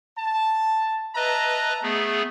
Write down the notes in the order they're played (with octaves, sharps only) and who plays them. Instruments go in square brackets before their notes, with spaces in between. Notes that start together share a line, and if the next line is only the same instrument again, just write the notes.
[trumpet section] A5
[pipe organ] B4 D#5 [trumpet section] E5 A5 A#5
[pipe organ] A3 B3 G#4